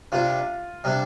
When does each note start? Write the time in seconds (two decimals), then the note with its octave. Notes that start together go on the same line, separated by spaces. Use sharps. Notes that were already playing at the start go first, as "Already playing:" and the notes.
0.12 C3 G3 D4 F4
0.84 C3 G3 D4